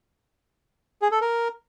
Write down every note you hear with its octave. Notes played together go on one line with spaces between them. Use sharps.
G#4
A4
A#4